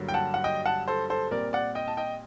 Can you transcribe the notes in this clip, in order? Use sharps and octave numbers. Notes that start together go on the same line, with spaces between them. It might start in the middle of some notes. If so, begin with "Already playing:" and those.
Already playing: G2 D3 F#3 A#3
G5
F#5 A5
F#5
D#5 G5
F#5 A5
A4 C5
A4 C5
A#2 G3 C4 A#4 D5
D5 F#5
D#5 G5
A5
D#5 G5